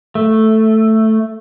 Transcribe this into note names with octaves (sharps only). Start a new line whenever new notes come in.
A3